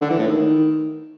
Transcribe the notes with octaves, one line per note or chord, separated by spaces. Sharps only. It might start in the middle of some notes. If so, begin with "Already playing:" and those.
D3
E3
A2
D#3